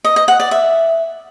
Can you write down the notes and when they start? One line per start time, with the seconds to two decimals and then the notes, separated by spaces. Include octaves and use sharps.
0.04 D#5
0.16 D#5
0.28 F#5
0.40 D5
0.51 E5